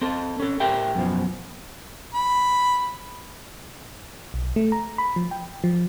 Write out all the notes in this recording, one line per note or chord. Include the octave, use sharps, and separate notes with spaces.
C4 A4
C#4 A4
A2 G4 A#4 E5 G5
F#2 B2 F3
B5
B1
A3
A#5
B5
F3
G5
F3